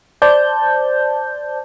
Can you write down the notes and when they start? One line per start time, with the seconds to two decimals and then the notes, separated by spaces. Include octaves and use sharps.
0.22 C5 D5 A5 G6